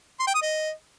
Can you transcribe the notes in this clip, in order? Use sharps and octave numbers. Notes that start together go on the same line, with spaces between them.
C6
G5
D#6
D#5